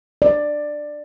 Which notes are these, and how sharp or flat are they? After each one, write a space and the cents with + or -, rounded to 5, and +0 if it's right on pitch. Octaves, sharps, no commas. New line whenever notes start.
D5 +10